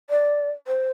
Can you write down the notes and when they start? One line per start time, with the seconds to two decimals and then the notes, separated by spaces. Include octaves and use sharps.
0.10 D5
0.67 C5